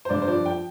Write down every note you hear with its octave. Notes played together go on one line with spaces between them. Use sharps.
C5
G2 D5
C5
F3 D5
G5